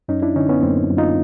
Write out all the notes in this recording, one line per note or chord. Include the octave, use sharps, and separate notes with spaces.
F#2 C#4 D#4
D4 E4
D3 C#4 D#4
B3 C#4
F#2 A#3 C4
F#2
D#4 F4